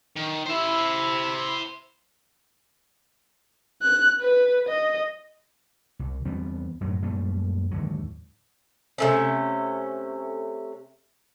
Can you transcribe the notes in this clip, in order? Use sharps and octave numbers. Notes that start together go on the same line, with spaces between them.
D#3
E4 C5 E5
F#6
B4
D#5
C2
E2 G3 B3 C4
F#2 A2 F#3
F#2 A#2 G3 A3
D#2 G#2 D3 F#3
C3 A3 C#4